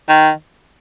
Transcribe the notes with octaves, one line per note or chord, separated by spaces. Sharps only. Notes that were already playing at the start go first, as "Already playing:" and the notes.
D#3